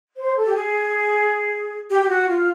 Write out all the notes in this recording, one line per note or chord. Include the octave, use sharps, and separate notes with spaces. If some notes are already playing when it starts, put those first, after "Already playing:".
C5
A4
G4
G#4
G4
G4
F#4
F4